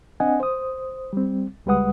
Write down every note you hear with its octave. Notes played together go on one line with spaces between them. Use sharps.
C4 D4 D#5 F#5 G#5
C5 D#6
G3 C4
C#2 G3 G#3 B4 F#5 D#6